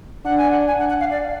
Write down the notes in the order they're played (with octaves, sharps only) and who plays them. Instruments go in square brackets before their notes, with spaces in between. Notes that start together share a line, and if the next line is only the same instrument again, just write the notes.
[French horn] D4 [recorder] F#5
[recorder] G#5
F#5
G#5
F#5
F#5
F5
D5